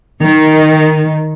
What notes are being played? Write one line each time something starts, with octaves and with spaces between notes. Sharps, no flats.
D#3